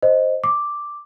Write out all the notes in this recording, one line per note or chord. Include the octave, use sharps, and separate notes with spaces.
C5 D#5
D6